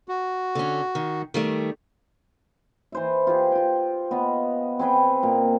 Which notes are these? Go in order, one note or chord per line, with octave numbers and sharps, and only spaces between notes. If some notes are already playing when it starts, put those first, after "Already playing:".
F#4
D3 C#4
D#3
D#3 G3 A3
E3 C5 E5
F4 G4 G#4
F4 G5
B3 D#5 F5
C4 G#4 B4 G5
A#2 A#4